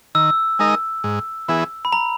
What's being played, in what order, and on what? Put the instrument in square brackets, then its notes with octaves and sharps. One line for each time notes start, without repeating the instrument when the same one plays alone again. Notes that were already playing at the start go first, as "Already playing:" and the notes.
[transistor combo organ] D#3 [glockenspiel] E6
[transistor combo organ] G#3 D#4 A#4 D#5
G#2
E3 B3 E4 G#4
[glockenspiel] B5
A#5